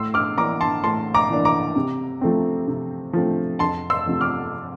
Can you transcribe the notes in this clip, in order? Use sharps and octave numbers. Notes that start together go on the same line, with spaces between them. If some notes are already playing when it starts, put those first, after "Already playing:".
Already playing: A2 C6 E6
D6 F6
E3 A#3 D4 A#5 D6
A5 C6
A2 A5 C6
A#5 D6
E3 A#3 D4
A#5 D6
C3
F3 A3 C4
C3
F3 A3 C4
F2 A5 C6
C6 E6
C3 F3 A3
D6 F6